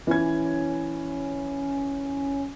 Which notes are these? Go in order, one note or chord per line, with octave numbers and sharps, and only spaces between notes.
E3 C#4 G#6